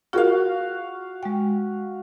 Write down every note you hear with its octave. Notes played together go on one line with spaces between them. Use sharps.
F4 F#4 G#4 A#4 F5
G#3 G5